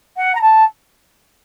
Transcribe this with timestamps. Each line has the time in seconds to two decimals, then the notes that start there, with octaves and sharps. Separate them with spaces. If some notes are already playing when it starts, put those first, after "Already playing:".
0.17 F#5
0.35 A#5
0.41 A5